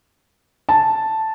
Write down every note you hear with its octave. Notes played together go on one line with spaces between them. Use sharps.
A5